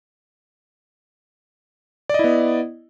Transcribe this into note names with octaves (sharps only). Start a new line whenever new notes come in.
B3 E4 D5 D#5